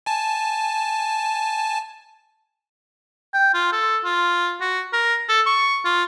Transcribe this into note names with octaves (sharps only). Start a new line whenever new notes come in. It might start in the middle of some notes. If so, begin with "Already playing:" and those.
G#5 A5
G5
F4
A4
F4
F#4
A#4
A4
C#6
F4